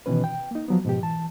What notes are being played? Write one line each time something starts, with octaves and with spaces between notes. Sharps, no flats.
B2 D#3 E3 C#4 B4
G5
A#3 D#4
F3 F#3 B3
G#2 B2 F3 G4
E3 A5